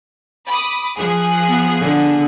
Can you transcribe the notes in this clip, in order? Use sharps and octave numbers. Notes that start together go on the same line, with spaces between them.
B5 D6 D#6
F3 G#4 F#6
B3
D3 B3